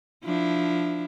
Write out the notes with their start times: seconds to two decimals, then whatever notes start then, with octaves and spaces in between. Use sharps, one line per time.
0.25 F3 D4 E4